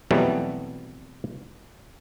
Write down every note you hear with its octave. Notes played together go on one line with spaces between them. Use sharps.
F2 B2 E3 F#3 G3 A3